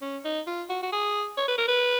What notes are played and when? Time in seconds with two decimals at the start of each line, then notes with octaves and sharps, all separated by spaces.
0.02 C#4
0.24 D#4
0.47 F4
0.69 F#4
0.83 F#4
0.92 G#4
1.37 C#5
1.48 B4
1.58 A#4
1.68 B4